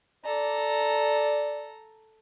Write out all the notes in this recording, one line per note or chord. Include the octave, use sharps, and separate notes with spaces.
A4 D5 A#5